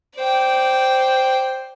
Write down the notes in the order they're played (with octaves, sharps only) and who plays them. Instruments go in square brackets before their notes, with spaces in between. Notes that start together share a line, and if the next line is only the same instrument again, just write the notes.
[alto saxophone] C5 [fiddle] D5 G5